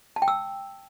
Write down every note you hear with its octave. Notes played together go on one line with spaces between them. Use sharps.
A5
G5
E6